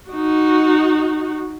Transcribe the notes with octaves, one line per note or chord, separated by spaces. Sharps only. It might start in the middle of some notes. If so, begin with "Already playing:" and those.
D#4 F#4